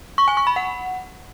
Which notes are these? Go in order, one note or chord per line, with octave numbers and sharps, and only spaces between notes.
C#6
G#5
C#6
B5
F#5